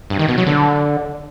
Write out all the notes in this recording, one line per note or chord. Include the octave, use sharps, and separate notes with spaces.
G2
D#3
B2
F#3
D3